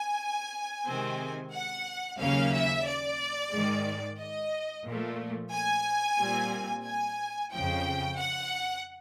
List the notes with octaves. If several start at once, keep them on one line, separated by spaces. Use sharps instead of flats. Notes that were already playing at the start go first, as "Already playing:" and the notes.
Already playing: G#5
C3 D#3 G#3 C4
F#5
D#2 C#3 F#3 A#3 C#4 F5
E5
D5
G#2 D#3 G#3
D#5
A#2 F3 A3
G#5
A#2 G3 C4
G#5
F2 C#3 F3 G5
F#5